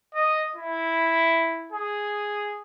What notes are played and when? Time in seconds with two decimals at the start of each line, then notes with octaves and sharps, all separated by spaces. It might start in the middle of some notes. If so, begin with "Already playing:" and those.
0.15 D#5
0.56 E4
1.72 G#4